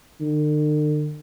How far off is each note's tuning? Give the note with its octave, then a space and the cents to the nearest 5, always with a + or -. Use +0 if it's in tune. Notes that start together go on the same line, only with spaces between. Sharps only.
D3 +45